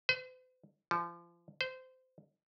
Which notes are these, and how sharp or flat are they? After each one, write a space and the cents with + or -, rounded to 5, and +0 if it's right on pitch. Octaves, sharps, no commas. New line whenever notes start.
C5 -45
F3 -30
C5 -20